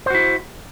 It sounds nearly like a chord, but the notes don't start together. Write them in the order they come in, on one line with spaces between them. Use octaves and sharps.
C5 F#4 E4